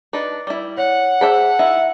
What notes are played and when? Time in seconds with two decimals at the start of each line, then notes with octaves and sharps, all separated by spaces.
0.13 D4 D#4 B4
0.47 G3 E4
0.77 C#5 F#5
1.21 G#4 C5 E5 G5 A5 B5
1.59 D#4 E4 E5